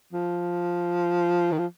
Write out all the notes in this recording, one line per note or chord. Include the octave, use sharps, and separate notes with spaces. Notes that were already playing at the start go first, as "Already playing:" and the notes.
F3
D#3
F3